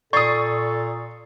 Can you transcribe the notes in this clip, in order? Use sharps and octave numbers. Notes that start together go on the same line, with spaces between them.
A#2 A4 D5 C#6 D#6 A6 C7